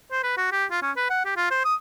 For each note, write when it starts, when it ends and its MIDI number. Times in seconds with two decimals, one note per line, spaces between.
0.12 0.23 72
0.23 0.35 71
0.37 0.50 66
0.52 0.65 67
0.71 0.81 65
0.82 0.91 61
0.96 1.08 71
1.10 1.24 78
1.25 1.32 67
1.36 1.48 65
1.51 1.61 72
1.65 1.75 87